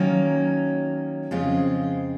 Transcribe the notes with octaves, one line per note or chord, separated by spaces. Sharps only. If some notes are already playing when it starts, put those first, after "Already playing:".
Already playing: D#3 F#3 A#3 C#4
F2 C#3 G#3 C4 F4